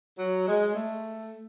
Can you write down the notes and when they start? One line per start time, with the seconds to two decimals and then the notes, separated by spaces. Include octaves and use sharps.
0.18 F#3
0.47 G#3
0.74 A3